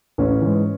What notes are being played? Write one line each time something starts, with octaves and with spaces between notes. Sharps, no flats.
A1 C#4
G#2 E3